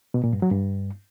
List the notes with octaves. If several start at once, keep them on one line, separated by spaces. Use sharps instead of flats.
B2
A#2
G2
F#3
G2